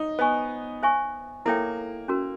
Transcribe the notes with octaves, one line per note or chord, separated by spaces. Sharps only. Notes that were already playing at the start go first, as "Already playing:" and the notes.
Already playing: D#4
B3 C5 D#5 G#5 C#6
C5 E5 G#5 C#6
A#3 E4 A4 C#5 E5 G5
C#4 F#4 A#4